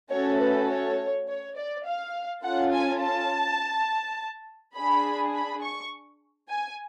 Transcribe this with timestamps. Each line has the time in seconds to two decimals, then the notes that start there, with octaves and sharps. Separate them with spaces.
0.11 A3 C#4 F#4 A4 C#5
0.40 B4
0.69 C#5
1.28 C#5
1.56 D5
1.85 F5
2.43 C#4 F4 A4 F#5
2.72 G#5
3.02 A5
4.75 D4 G#4 B5
5.34 B5
5.62 C#6
6.50 G#5